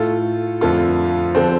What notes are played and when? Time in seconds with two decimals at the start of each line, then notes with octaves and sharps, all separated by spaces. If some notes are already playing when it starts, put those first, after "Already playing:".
Already playing: A2 A3 F4 A4
0.61 F2 D3 A3 F4
1.35 D3 F3 C4